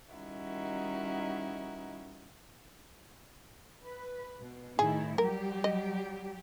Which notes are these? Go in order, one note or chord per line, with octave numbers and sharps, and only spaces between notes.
D#3 G3 C#4 D#4 E4 F#4
B4
B2
A2 D#3 E4 G#4
F#3 G3 G4 A#4
D#5